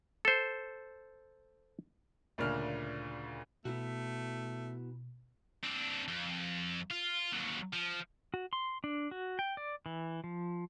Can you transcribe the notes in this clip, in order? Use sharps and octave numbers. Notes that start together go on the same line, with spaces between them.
A4 C5
D2 A#2 C#3 D4 F6
B2 A3 B3 E4 F#4
C4 D4
F2
F4
D#2 F#3
F3
F#4
C6
D4
F#4
G5
D5
E3
F3